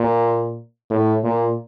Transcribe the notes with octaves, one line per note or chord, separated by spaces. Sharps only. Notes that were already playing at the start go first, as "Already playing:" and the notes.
Already playing: A#2
A2
A#2